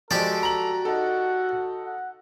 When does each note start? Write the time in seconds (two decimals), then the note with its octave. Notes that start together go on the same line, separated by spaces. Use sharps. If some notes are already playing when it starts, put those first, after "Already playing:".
0.11 F3 G#3 F#4 G4 A4 D5
0.43 A#5 F#7
0.85 D#4 A4 F#5
1.84 F#5